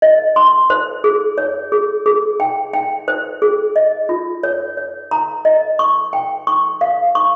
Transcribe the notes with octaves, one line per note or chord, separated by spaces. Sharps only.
D#5
C6
C5
G#4
C#5
G#4
G#4
G5
G5
C5
G#4
D#5
F4
C#5
C#5
A#5
D#5
C#6
G5
C#6
F5
C#6